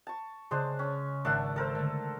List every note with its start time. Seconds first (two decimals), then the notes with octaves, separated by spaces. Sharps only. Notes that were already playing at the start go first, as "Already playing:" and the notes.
0.07 A5 C#6
0.51 C#3 G#3 D4 C5
0.79 C#4
1.25 G#1 D4 E5 F#5 A5
1.56 A4 A#4 C5
1.75 D3 A3